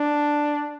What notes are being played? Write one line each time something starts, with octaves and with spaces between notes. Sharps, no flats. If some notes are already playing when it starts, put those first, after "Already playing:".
Already playing: D4